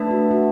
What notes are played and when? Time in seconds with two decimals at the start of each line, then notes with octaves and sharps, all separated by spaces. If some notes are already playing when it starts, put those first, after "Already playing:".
Already playing: A3 D4 B4 E5 A5
0.11 F#4
0.31 F#4